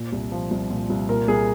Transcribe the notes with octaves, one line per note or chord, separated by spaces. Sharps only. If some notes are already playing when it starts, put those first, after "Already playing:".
Already playing: A#2
C2
F3
C2
A#2
C2
A#2 A#4
C2 G#4